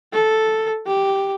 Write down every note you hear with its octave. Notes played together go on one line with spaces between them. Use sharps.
A4
G4